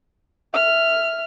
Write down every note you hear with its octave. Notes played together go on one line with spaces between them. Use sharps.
E5 F6